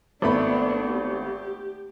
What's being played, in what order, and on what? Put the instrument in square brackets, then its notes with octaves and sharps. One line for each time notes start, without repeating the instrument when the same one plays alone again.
[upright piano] G#1 A3 B5 [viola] B3 D4
[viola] G4